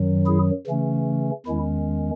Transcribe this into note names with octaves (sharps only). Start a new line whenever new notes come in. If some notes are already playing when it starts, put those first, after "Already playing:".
Already playing: F#2 D#3 F#3
E4 G#4
C#3 E3 A3 C#4
E2 D#3 G#3 C#4 E4